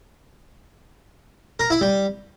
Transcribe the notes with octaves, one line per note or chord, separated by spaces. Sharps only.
A#4
E4
G3